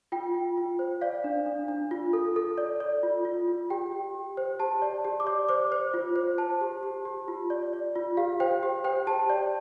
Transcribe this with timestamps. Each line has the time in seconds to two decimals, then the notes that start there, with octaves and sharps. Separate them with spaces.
0.12 F4 G5
0.34 F4
0.57 F4
0.79 C5
1.01 D5 F5
1.24 D4
1.46 D4
1.68 D4
1.91 F4
2.13 A4
2.36 A4
2.58 D5
2.80 D5
3.03 F4
3.25 F4
3.48 F4
3.70 G4 G5
3.92 G4
4.15 G4
4.37 C5
4.59 G4 A5
4.82 D5
5.05 G4
5.20 D6
5.27 D5
5.49 C5 D6
5.72 C5
5.94 F4
6.16 C5
6.38 C5 A5
6.61 G4
6.83 G4
7.05 G4
7.28 F4
7.50 D5
7.73 D5
7.96 F4
8.17 G4 F5
8.40 C5 G5
8.63 G4
8.84 C5 G5
9.07 G4 A5
9.30 D5